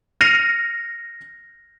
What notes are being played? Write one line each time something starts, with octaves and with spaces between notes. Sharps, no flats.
F6 A#6 C7 C#7 D#7 F7